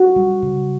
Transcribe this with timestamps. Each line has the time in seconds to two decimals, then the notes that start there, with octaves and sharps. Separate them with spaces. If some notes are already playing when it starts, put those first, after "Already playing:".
Already playing: F#4
0.16 G3
0.43 C#3